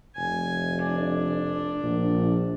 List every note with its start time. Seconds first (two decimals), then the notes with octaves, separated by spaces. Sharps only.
0.17 F1 G#5
0.83 D4
1.82 A#1